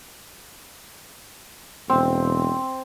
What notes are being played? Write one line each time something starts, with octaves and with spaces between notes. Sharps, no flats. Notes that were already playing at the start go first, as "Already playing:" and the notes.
E1 C4